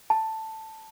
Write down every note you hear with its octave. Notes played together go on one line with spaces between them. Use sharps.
A5